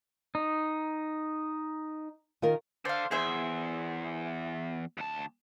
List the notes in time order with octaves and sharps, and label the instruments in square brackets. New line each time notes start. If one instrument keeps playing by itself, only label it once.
[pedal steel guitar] D#4
[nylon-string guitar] D#3 F4 A#4
[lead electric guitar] A4 D5 [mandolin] C5 F5
[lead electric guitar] E2 [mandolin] G#4 C5 E5
[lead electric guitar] D2 A5